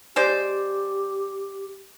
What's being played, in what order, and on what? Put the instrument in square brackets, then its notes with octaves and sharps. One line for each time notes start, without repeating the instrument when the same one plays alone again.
[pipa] G#3 C5 D5 [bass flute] G4